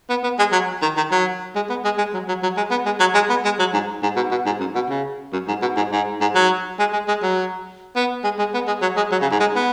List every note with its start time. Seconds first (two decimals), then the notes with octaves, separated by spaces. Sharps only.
0.10 B3
0.23 B3
0.39 G#3
0.52 F#3
0.82 D#3
0.97 D#3
1.12 F#3
1.55 G#3
1.69 B3
1.85 G#3
1.98 G#3
2.14 F#3
2.28 F#3
2.43 F#3
2.57 G#3
2.71 B3
2.86 G#3
3.00 F#3
3.14 G#3
3.29 B3
3.45 G#3
3.59 F#3
3.74 G#2
4.03 G#2
4.16 B2
4.31 B2
4.46 G#2
4.60 F#2
4.75 B2
4.89 C#3
5.33 F#2
5.48 G#2
5.62 B2
5.76 G#2
5.92 G#2
6.21 G#2
6.35 F#3
6.79 G#3
6.93 G#3
7.08 G#3
7.23 F#3
7.96 B3
8.24 G#3
8.39 G#3
8.54 B3
8.67 G#3
8.82 F#3
8.97 G#3
9.11 F#3
9.22 C#3
9.31 G#2
9.40 G#3
9.56 B3